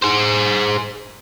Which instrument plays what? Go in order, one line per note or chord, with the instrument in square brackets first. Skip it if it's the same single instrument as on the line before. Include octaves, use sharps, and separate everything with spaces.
[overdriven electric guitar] G#4 C5